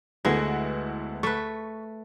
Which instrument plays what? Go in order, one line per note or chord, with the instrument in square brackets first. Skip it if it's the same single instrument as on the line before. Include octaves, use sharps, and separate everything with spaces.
[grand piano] D2 [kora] G#3 [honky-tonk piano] B3 E4 F#4
[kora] A3 B4 [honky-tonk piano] C#6